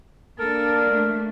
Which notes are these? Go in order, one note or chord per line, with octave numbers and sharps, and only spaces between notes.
A#3 D4 A4 A#4
A3